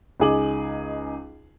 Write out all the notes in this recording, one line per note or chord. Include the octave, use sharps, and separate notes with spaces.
C#2 D#4 G#4 D6 F#7